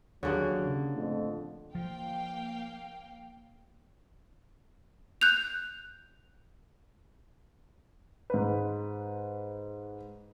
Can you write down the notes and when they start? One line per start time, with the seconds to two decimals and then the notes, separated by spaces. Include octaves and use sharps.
0.23 D#2 D3 F#3 A#3 G4 G#4 C#5
0.65 C#3
0.96 F2 A2
1.75 F3 A#3 F5 G5
5.21 F#6 G6 F7
8.30 G#2 B4